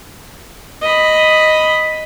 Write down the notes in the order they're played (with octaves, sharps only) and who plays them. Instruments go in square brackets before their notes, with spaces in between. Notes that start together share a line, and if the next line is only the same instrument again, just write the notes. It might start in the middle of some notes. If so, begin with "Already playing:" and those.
[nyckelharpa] D#5 B5